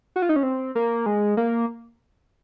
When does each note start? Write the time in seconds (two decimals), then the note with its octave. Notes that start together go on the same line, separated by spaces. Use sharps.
0.16 F#4
0.22 F4
0.29 D#4
0.36 C#4
0.43 C4
0.75 A#3
1.06 G#3
1.37 A#3